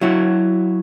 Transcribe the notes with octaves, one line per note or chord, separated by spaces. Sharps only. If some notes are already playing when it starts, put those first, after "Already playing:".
F#3 E4 F#4